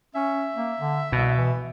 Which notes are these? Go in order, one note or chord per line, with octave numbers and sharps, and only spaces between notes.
C#4 E5
A#3
D3
C2 B2
E3